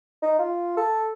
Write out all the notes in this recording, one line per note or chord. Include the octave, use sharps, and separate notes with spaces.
D#4
F4
A4